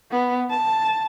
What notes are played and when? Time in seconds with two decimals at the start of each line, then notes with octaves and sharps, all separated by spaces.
0.11 B3
0.50 A5